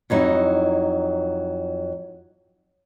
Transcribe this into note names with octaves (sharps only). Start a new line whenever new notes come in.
F2 F#3 D#4 E4